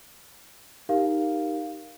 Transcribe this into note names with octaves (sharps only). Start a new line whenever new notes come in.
D#4 G4 A#4 F5